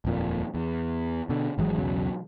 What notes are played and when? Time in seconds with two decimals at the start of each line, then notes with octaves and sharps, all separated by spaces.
0.05 D#1 F2 A#2
0.54 E2
1.29 B2 D3
1.58 G#1 E3 F#3 G#3
1.77 B1 E2 C#3 F#3